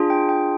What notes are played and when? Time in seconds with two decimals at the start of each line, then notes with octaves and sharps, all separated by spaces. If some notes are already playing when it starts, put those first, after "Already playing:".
Already playing: D4 F4 G#4
0.10 G5
0.29 G5